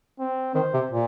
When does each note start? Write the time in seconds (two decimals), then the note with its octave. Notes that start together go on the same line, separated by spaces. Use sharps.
0.19 C4
0.55 D#3 C5
0.74 C3
0.91 A#2